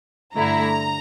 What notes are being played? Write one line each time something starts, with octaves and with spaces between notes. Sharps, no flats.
G2 D3 A3 E4 A#5